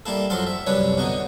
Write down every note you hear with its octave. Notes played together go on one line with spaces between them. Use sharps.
G3 A#3 E4 A4
F#2 F3 F#3 A4 F5 C6
E5
C2 F#2 C#4 D4 B4 C#5
B2 D3 D#4 C#6